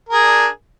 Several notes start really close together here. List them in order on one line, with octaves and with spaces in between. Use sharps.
A#4 G#4 D4